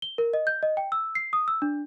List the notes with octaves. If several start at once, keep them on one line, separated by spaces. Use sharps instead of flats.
G7
A#4
D#5
G6
D#5
G5
E6
C7
D#6
E6
D4